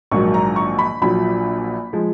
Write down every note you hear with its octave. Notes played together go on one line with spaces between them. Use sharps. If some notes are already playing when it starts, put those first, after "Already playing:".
A#1 G#2 D#3 F#3 C#6
A#5
C#6
B5
A#1 A#2 F#3 B5
F3 G#3